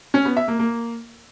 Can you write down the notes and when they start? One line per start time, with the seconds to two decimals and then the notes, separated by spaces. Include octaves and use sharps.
0.14 C#4
0.25 B3
0.37 E5
0.48 A#3
0.59 A#3